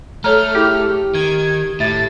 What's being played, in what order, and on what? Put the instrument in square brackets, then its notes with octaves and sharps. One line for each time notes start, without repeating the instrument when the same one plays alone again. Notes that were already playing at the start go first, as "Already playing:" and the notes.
[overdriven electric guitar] A3 [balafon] A4 C#5 A#5 [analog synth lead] F6
[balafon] E4 G#4 [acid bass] G4
[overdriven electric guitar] D#3 [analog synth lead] G#6
[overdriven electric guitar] A2 [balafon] G4 E5 [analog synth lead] A6